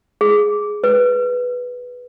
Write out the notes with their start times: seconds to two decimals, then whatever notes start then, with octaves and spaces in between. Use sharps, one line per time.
0.21 G#4
0.84 B4